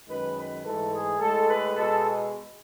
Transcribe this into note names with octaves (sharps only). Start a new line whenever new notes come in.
F#2 D#3 G#3 B4
B4
G#2 E3 A3 A4
G#4
A2 G#3 A4
B4
B2 G#3 A4